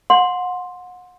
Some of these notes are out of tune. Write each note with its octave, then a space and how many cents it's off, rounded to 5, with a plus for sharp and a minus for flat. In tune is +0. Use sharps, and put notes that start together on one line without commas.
F#5 -35 C6 +0